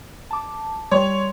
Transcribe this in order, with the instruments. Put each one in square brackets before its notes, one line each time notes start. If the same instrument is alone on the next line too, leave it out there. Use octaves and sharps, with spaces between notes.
[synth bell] A5 D6
[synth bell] G3 C6 [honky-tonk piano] C#5